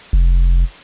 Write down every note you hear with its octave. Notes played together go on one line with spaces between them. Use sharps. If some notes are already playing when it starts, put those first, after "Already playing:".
F1